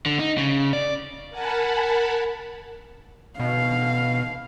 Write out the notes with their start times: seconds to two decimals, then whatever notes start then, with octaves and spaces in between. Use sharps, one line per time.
0.06 D3
0.19 D#4
0.38 C#3
0.73 D5
1.30 A#4 F#5 G#5 A5 B5
3.40 B2 F5